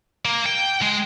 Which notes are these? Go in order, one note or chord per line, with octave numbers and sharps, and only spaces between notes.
A#3
G5
G#3